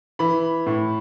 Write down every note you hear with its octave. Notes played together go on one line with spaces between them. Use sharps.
E3 B5
A2